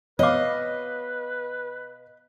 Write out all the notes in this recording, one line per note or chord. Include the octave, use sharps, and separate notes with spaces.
B2 B4 C#5 D#5 F5 D6